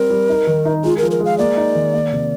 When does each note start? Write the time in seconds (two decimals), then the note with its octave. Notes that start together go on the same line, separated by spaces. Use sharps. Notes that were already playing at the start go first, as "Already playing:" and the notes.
Already playing: G3 C4 A#4
0.10 G3
0.29 D#4
0.47 D#3
0.65 D#4
0.84 G#3 F4
0.98 A#4
1.03 F3
1.11 A#4
1.20 G#3 F5
1.38 A#3 D5
1.57 D#4
1.75 D#3
1.94 A#3
2.13 C3